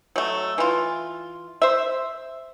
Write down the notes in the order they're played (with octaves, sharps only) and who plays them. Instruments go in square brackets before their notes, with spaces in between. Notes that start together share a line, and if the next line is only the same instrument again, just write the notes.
[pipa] F#3 A3
E3 F4
C5 E5